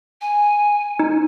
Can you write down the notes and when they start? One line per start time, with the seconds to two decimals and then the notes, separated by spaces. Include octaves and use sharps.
0.21 G#5
0.99 D#4